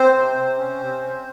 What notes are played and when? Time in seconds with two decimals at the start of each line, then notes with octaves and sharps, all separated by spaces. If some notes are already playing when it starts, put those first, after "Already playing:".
Already playing: C4 C5
0.14 C3
0.36 C3
0.57 C#4
0.79 C3
0.99 C#4